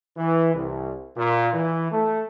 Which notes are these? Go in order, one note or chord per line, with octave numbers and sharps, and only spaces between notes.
E3
C2
A#2
E3
A3